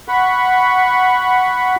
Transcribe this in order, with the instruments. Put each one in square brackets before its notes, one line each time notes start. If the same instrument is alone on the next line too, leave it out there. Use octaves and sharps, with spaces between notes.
[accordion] F#5 B5 C#6